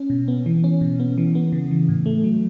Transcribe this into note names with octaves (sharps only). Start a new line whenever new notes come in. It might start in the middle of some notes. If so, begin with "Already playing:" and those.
Already playing: C#4
B2
B3
E3
C#4
B2
B3
E3
B3
C#3
E3
A2
A3
F#3